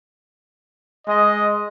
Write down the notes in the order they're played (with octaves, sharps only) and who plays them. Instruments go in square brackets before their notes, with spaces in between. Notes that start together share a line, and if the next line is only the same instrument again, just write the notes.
[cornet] G#3 [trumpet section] D#5